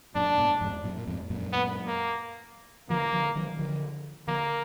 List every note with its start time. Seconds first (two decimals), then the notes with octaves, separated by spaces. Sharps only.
0.15 F#2 A#2 D4
0.38 G#2 B2
0.61 F2 G#2
0.84 F#2 A#2
0.97 A#2
1.07 F2 G#2
1.30 F#2 A#2
1.53 B3
1.87 A#3
2.90 D3 F3 A#3
3.13 D3 F3
3.36 D#3 F#3
3.59 D3 F3
4.27 D3 F3 A#3